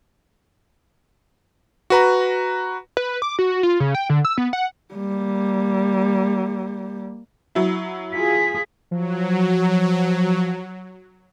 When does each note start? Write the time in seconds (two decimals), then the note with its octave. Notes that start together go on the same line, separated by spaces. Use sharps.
1.90 F#4 B4 A#5
2.97 B4
3.22 D6
3.39 F#4
3.63 F4
3.80 C#3
3.95 G5
4.10 D3
4.25 E6
4.38 B3
4.53 F#5
4.94 G3 A#3
7.55 F#3 E4
8.12 F4 G#4 B6
8.91 F3 F#3